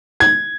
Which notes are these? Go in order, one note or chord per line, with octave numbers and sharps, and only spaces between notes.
G#6